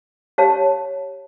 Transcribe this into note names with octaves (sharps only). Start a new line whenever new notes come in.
G4 C#5 F5 A5